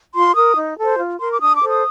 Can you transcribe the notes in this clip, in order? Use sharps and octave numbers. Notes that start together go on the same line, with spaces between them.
F4 C6
A#4 D#6
D#4
A4 C5
F4
A#4 C6
D6
D4 D#6
D6
A4 C5
D#6